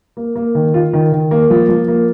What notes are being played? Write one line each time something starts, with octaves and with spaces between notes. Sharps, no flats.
A#3
A#3
D#3
F4
D#3
D#3
A#3
F3
F3
A#3